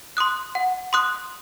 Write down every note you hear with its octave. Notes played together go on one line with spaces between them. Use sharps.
C6 D#6 F#6
F#5
C6 D#6 F#6